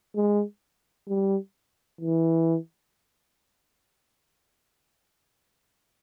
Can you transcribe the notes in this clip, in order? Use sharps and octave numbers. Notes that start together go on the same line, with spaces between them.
G#3
G3
E3